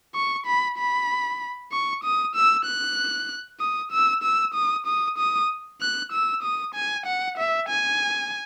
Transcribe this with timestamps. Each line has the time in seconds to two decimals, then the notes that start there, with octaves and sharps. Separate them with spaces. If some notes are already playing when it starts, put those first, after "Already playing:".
0.15 C#6
0.46 B5
0.78 B5
1.72 C#6
2.03 D#6
2.35 E6
2.66 F#6
3.60 D#6
3.92 E6
4.23 E6
4.54 D#6
4.86 D#6
5.18 D#6
5.81 F#6
6.12 E6
6.43 D#6
6.75 G#5
7.06 F#5
7.38 E5
7.69 G#5